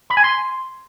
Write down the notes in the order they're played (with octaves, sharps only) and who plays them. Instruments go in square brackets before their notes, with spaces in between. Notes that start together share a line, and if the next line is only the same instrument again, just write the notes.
[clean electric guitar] B5
G#5
C6